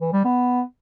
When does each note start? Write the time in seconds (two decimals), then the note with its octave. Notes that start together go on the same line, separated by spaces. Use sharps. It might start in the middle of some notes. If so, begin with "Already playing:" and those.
0.01 E3
0.13 G3
0.25 B3